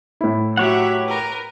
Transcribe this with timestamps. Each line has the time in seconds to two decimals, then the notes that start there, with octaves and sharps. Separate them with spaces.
0.21 A2 E4
0.57 F#3 G4 C#5 E5 F#5
1.06 A#4 B4